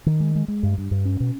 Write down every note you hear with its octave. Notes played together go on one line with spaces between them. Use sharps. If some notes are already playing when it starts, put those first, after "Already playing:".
D#3
G#3
G#3
G#3
G2
G2
G2
C#4
B2